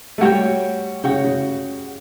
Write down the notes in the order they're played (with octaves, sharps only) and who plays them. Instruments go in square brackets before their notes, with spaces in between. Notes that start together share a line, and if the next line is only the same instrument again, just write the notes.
[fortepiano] A3
[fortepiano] G3 [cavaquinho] F#4 C#5 G5
[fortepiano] C#3 [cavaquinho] F#4 C#5 G5
[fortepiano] C#3